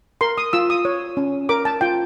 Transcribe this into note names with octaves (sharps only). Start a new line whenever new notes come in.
A#4 C6
D#6
F4 E6
D#6
C#5
C#4
A#4 D6
A5
F4 G5